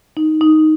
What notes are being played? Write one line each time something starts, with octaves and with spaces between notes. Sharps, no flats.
D#4
D#4